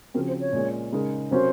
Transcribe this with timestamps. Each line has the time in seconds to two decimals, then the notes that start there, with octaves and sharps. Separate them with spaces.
0.14 C#3 F3 C4 F#4 A#4
0.27 C5
0.40 C#5
0.53 A#2 G#3 C#4
0.92 C#3 G#3 D#4 A#4
1.31 C3 F#3 C#4 F#4 A#4 C5